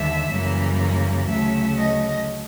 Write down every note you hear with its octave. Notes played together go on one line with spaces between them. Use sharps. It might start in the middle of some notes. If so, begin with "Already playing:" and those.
Already playing: D#2 D3 G3 E5
F#2 C#3 E3 G3 A#3
D2 C#3 F#3 A3 E5
D#5